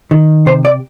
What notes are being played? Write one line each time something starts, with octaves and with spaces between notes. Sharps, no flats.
D#3
C3 C5
D5